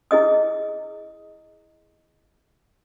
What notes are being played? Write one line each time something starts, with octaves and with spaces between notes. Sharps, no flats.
E4 G#4 D#5 D#6